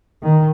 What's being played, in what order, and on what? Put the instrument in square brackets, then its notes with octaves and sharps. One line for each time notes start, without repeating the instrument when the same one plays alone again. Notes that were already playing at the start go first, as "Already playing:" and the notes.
[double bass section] D#3